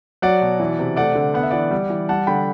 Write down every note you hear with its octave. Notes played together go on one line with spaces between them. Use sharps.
F#3 D5 F#5
B2
E3
C3
A3 D5 F#5
D3
B3 F#5
E5
E3 D5 F#5
G3
E3
G3 F#5 A5
D3 G5 B5